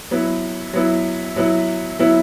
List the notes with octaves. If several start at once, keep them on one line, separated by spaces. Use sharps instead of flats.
F#3 B3 E4
F#3 B3 E4
F#3 B3 E4
F#3 B3 E4